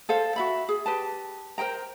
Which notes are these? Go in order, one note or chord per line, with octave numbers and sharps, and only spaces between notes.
A4 C5 F5
F#4 E5 B5
G#4
G4 B4 A5
A#4 C5 G5 A#5